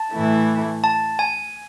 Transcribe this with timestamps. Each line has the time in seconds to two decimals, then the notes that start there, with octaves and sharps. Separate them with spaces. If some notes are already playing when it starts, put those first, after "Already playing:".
Already playing: A5
0.11 A2 E3 A3 E4
0.84 A5
1.19 G#5